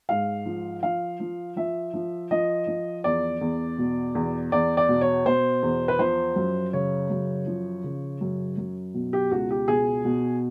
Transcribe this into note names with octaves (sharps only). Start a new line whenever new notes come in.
G#2 F5
F3
F3 F5
F3
F3 E5
F3
F3 D#5
F3
E2 D5
E2
B2
E2
E2 D5
D5
B2
C#5
B2 C5
E2
B4
F3 C5
F#2
C#3 C#5
F#2
F3
C#3
F#2
F#2
B2
G4
C#2 F#4
G4
B2 G#4
B2